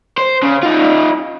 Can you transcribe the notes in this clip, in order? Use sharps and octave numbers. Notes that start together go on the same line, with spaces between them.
C5
C#3
D#4 F4